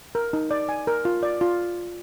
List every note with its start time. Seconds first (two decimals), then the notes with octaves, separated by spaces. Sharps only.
0.15 A#4
0.33 D#4
0.51 D5
0.69 G#5
0.87 A#4
1.05 F4
1.23 D5
1.41 F4